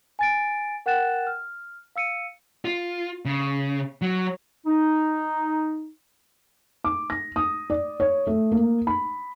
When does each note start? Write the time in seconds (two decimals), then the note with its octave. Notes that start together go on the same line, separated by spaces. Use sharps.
0.19 G#5 A6 D7
0.86 A#4 F#5 G5 F#6 A6 E7
1.27 F6
1.96 F5 E6 C#7 D#7
2.65 F4
3.25 C#3
4.02 F#3
4.66 D#4
6.84 D6
7.10 A#6
7.36 D#6
7.70 D5
8.00 C#5
8.27 A3
8.52 A#3
8.87 B5